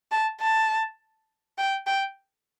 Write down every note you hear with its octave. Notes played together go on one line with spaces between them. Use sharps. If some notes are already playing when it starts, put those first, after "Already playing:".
A5
A5
G5
G5